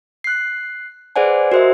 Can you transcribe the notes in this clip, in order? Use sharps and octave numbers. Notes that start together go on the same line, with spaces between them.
F#6 C7
G#4 B4 C5 D5 F#5 G#5
F#4 A#4 C5 D#5 E5